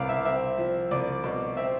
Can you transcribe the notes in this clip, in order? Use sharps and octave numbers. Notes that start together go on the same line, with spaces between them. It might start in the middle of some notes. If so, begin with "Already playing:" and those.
Already playing: C2 B3 D5 F5
E5
C4 E5
F3
C2 D5
B2
C4 E5